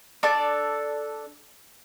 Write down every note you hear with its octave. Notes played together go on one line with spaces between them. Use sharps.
D4 A4 D5